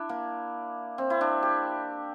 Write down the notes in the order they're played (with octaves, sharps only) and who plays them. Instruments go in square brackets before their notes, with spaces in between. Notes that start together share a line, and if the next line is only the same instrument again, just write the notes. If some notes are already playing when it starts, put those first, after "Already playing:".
Already playing: [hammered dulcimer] D4 E4
A#3
C4
E4
D4
G4